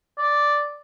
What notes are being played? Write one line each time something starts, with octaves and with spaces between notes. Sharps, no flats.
D5